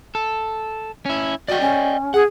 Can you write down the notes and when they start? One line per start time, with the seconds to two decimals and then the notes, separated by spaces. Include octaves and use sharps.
0.15 A4
1.06 C#4 E4
1.48 F#4 D5 D#5 G5
1.60 C#4
2.14 G#4 F#5